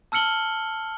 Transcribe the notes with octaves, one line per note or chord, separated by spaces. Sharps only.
A5 E6 F6 C#7 F#7 G7